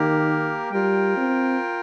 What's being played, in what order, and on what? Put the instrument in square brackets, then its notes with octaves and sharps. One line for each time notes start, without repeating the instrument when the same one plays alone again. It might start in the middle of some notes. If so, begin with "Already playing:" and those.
Already playing: [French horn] D#3 [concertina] A#3 G4 A#4
[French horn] G3 [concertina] F4 A#4 G5
[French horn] C4